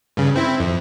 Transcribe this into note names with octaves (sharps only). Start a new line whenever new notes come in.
G2 C#3
C4 E4
F2